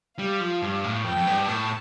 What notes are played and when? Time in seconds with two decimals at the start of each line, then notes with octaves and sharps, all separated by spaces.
0.19 G3 F5
0.41 F3
0.62 G2
0.84 A2
1.04 F2 G5
1.16 F2
1.27 G2
1.47 A2 A5